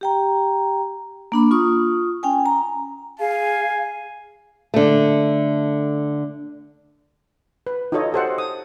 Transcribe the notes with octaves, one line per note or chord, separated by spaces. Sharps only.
G4 G5 A#5
A#3 D4 B5
F4 C#6 D#6
C#4 G5 G#5
A#5
G#4 F5 G#5
D3 A3
B4
D#4 F4 F#4 A4 C#5 D#5
G4 A4 C5 F#5
D#6